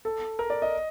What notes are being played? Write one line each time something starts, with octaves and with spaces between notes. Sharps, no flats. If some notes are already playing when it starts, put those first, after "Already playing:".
A4
A#4
D5
D#5